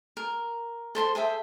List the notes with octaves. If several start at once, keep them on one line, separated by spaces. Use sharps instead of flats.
A#4
A4 C5 B5 C6
G#4 A4 E5 G5